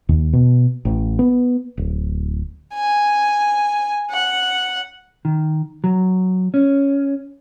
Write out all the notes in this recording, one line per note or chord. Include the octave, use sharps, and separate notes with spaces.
D#2
B2
A1
B3
D1
G#5
F#5
D#3
F#3
C#4